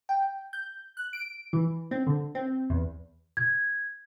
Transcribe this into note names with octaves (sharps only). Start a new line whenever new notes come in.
G5
G6
F#6
D7
E3
C4
D3
C4
E2
G#6